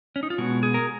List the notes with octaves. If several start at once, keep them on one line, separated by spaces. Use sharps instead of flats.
C#4
D#4
F4
B2 G#3 B3 F#4
G#4
A#4